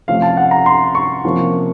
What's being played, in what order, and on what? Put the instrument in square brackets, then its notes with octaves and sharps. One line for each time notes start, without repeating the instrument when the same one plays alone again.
[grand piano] C3 F3 A3 C#4 F5
A5
F#5
A#5
C6
C#6
C3 F3 A#3 C#4